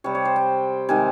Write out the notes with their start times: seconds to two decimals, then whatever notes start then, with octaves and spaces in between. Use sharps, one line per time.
0.04 C3 G3 C#5
0.15 C#5
0.25 C5
0.36 G5
0.89 C3 D#3 G#3 G#5